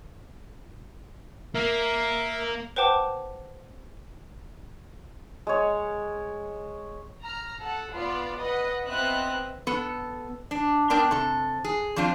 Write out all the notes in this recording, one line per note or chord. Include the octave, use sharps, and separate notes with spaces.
A#3 A#4 E5
B4 C5 F#5 G5 A5 D6
G#3 C#5
A#5 F6
A4 F#5
B3 F4 D5
B4 D#5 F#5
B3 C4 F4 D#5 E5 F#6
B3 A4
D4
B3 D4 A#4 G5
C3 A4
G#4
F2 C4 D4 F4